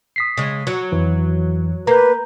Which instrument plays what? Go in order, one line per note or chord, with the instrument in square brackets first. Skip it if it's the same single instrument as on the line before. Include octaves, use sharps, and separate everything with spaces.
[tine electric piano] D#6 B6 C7
[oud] C#3 G#3
F#3
[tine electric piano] F2 E3
[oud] A#3 [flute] B4 [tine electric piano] A#5 G6